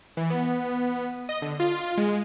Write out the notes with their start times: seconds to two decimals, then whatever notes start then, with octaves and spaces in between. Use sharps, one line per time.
0.17 E3
0.30 B3
1.29 D#5
1.42 D3
1.60 F4
1.98 G#3